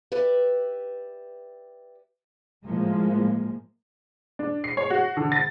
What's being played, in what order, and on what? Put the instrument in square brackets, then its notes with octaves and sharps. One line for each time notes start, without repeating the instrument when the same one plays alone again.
[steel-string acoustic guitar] G4 B4 D5 E5
[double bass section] A2 F3 G#3 A#3
[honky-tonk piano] D4
C7
C#5
F#4
D3
A6